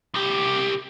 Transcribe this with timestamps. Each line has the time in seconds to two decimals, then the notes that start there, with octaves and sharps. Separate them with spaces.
0.14 C2 G4